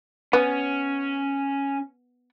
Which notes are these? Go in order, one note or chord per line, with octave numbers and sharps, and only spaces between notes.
B3 C#4